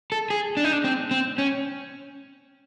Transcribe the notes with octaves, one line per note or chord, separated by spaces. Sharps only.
A4
G#4
D4
D#4
D4
C4
C4
C#4